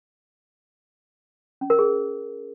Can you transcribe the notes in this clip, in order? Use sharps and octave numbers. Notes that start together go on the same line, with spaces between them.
C#4
A#4
G#4